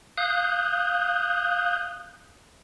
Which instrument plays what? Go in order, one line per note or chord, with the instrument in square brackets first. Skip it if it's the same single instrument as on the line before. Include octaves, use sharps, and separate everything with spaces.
[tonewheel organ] F5 D#6 F#6 G6